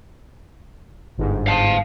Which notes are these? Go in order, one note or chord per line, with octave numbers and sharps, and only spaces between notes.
G1 G#2
F5 A5